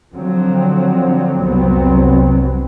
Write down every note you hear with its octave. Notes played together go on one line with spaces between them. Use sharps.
D3 F3 F#3 C4
F1 C2 F#3 B3 C4